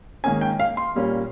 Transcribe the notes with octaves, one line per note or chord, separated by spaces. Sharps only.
G#2 D#3 A#3 C#4 G#5
G5
F5
C6
A#2 G3 A#3 C#4